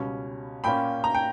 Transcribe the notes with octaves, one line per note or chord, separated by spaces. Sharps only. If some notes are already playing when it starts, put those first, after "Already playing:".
Already playing: C#2 B2 G3 C#4
A#2 A#3 C#4 G5 B5
A#5
G5